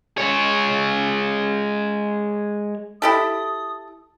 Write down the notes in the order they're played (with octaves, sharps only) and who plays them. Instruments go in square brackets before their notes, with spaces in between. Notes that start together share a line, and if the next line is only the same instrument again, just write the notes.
[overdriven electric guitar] G#3 C#5
[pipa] E4 G4 A4 [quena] D#6